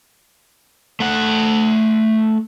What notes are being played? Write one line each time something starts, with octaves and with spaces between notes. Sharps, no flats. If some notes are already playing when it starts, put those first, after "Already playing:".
A3 F#5